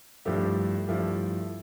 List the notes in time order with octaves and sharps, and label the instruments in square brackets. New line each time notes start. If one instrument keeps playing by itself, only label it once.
[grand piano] G2 F3 A3 E4 G4
G2 F3 A3 E4 G4